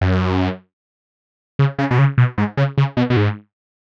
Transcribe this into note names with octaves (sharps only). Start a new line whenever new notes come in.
F#2
C#3
C#3
B2
C#3
B2
G#2
C#3
C#3
B2
B2
G#2